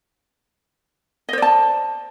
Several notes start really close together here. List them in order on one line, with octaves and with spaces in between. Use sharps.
D#5 C5 D5 A5